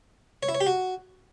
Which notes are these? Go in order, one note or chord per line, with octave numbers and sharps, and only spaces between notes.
C#5
E4
C#5
G4
F#4